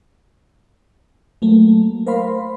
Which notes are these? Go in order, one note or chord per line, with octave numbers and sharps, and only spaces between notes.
F#3 A3 A#3
A#4 C5 F5 B5 C6